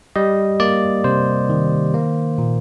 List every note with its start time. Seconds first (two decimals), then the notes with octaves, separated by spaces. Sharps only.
0.16 G3 D#5
0.60 A#3 D5
1.04 C3 C5
1.50 D#3
1.94 A#3
2.38 A#2